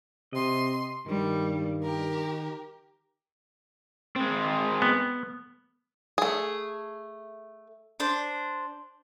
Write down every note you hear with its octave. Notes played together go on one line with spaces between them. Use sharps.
C3 D#5 C6
G2 D#3 G3
G4 A#4
G#3 C4
B3
A3 G#4
D4 C5